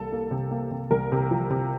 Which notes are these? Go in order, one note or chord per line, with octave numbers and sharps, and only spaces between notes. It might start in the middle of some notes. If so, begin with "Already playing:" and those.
Already playing: C2 A#3 A4
A#3
C3
A#3
C3
C2 A#4
C3
F3
C3